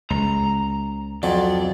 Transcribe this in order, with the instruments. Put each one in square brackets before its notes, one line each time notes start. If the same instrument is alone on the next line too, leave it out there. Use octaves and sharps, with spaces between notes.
[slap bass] C#2 [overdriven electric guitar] A#5
[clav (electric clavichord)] F2 [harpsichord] F#3 [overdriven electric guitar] D5